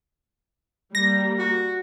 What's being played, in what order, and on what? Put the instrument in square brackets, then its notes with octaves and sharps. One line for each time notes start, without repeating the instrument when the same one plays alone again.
[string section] G3 A#3 [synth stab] A#6
[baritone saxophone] F#4